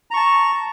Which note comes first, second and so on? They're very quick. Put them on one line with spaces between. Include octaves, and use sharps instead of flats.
A#5 C#6 A5